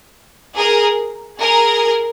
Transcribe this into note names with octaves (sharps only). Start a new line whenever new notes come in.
G#4 A#4
G#4 A#4